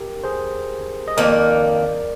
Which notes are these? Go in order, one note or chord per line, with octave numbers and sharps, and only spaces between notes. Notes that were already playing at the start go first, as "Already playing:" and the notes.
Already playing: G4 A#4
G#4 C5
D#5
F2 D#3 A#3 A#4 D5